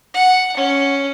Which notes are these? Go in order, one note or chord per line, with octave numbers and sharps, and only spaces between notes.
F#5
C#4